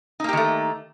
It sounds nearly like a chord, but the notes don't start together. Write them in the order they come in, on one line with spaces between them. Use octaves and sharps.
D#4 A#3 G4 D#3 A3